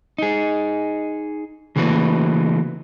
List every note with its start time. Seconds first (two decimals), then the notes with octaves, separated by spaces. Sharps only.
0.18 D#4 G#4
1.76 C#3 E3 A3 A#3 F#4 B4